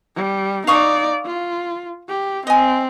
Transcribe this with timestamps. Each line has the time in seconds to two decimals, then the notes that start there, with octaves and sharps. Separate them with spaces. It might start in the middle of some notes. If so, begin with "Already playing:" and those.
0.16 G3
0.67 D#4 D5 F5 C#6 D#6
1.25 F4
2.09 G4
2.47 C4 D#5 G#5